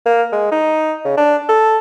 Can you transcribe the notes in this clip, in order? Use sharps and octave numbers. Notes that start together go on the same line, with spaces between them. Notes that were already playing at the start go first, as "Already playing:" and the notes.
A#3
G#3
D#4
C#3
D4
A4